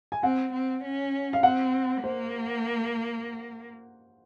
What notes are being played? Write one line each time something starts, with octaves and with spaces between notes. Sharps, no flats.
G#5
C4 F#5
C4
C#4
F5
C4 F#5
A#3 C5